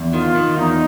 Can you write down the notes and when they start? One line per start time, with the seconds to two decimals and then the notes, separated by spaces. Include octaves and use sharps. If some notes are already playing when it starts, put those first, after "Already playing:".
Already playing: E2
0.13 D#3 F4
0.35 D#3
0.57 E2 D#4